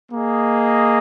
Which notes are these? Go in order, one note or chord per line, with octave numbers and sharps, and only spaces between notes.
A#3 G#4 D#5